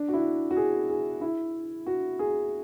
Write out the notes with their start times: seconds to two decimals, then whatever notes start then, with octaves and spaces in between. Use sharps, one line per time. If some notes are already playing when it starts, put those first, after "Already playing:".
Already playing: D4
0.08 F#4
0.13 E4
0.51 F#4
0.57 G#4
0.89 G#4
1.21 E4
1.87 F#4
2.19 G#4